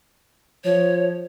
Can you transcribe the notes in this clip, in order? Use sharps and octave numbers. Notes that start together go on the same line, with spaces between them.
F3 C#5